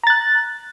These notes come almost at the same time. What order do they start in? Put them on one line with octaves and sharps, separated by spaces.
A#5 A6 F#6